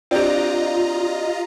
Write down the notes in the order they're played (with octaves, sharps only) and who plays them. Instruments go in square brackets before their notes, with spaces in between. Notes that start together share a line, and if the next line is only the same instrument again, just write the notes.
[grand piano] C4 D4 [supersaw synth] F4 D#5 A#5 [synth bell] G4 D5